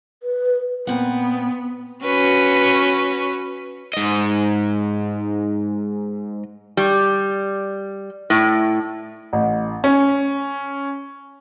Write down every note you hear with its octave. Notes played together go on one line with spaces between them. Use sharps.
B4
A#2 B3 C4 F#5
C#4 F#4 B4
G#2 D#5
G3
A2
A1
C#4